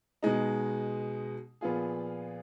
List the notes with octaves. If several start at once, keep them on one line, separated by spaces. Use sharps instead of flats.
B2 G#3 D#4
A#2 F3 B3 F4 G#4